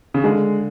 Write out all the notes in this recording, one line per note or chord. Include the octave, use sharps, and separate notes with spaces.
C#3
D3 G#3